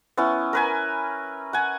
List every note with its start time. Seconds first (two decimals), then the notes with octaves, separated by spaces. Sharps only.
0.17 B3 C#4 E4
0.53 A#4 B4 G#5
1.53 F#5 G#5